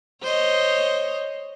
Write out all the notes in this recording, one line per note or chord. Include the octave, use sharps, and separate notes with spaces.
C5 C#5 D#5